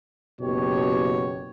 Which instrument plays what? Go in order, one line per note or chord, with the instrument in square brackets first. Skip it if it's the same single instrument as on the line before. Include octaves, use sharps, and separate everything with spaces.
[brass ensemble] F#1 B2 G4 C#5